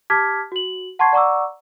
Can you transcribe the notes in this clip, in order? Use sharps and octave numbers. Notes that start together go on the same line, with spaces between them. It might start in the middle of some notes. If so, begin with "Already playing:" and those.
G4 A5 D6 F6 G#6 B6
F#4 F#7
F#5 A5 C6 C#6 G#6 C7
D5 F#5 A#5 C#6 D6 E6